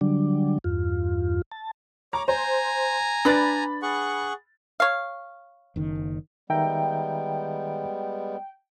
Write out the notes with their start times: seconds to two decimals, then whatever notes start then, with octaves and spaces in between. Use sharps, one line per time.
0.01 D3 F#3 G3 D4
0.64 E2 G2 F4
1.52 A5
2.13 C#5 A#5 D6
2.28 C5 G#5 A#5
3.25 D4 B4 D5 B5 A6
3.82 G#4 F#5 C#6
4.80 C#5 F5
5.76 F#1 D#3
6.50 D#3 G3 G#3 B3 E5 G5 A#5